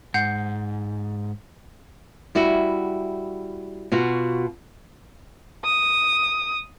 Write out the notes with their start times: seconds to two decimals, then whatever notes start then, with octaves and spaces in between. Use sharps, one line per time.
0.14 G#2 F#5 G6 C7
2.35 G3 E4 F#4
3.92 B2 F4 F#4
5.65 D#6